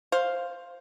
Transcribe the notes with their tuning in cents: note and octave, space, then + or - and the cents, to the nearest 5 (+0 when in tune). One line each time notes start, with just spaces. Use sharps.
C5 +5 F5 +0